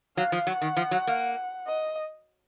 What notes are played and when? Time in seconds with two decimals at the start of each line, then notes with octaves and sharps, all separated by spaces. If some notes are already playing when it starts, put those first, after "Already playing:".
0.17 F#3 F5
0.32 F3
0.47 F#3 F#5
0.62 D#3
0.77 F3
0.91 F#3
1.07 A#3
1.67 D#5